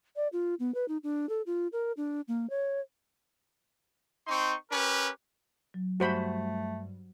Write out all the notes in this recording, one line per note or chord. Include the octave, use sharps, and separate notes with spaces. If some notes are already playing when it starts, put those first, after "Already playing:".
D5
F4
B3
B4
D#4
D4
A4
F4
A#4
D4
A#3
C#5
C4 D#4 C6 C#6
C#4 G4 A#4 B4
F#3
G2 G3 A3 F#4 C5 B5